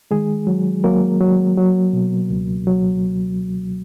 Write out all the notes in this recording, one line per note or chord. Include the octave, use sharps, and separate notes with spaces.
D#3 G#3 G#4
F#3
F#3 A#3 A#4
F#3
F#3
B2
C#2
F#3